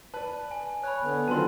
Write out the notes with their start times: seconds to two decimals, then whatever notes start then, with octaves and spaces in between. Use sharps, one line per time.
0.14 B4 D5 A5
0.51 G#5
0.83 C#5 B5 F#6
1.03 D3 B3
1.28 D3 D#3 F#3 B3 C4 F4 A5 C6